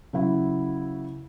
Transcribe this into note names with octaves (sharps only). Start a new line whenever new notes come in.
C#3 F#3 E4